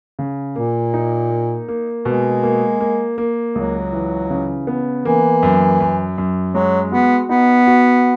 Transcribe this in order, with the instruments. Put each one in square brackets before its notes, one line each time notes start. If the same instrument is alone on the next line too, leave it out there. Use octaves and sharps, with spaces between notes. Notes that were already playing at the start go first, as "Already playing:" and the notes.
[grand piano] C#3
[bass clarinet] A#2 [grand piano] A#3
[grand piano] D#4
A#3
A#3
[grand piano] B2 [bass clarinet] G#3
[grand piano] A#3
A#3
A#3
[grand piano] C#2 [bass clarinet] F#3
[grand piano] E3
C#3
B3
[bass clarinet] E3 [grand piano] A#3
[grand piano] F#2
F#2
F#2
[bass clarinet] F#3 [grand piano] G#3
[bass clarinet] B3 [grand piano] F#4
[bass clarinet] B3 [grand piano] D#4
[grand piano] F#4